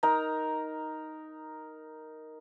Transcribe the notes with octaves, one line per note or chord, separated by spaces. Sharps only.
D#4 A#4 A#5